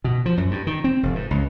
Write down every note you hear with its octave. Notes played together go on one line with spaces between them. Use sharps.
B2
F3
F#2
G2
D#3
C4
F1
G#2
C#2